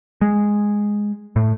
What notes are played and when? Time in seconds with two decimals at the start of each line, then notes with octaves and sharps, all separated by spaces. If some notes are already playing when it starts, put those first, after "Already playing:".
0.21 G#3
1.36 A2